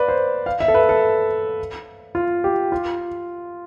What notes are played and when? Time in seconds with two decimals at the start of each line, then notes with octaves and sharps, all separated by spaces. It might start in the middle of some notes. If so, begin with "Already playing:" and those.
Already playing: B4 D5 F5
0.08 C5
0.46 F5
0.60 E5
0.68 A4
0.74 B4
0.89 A4
2.15 F4
2.44 G4
2.72 F4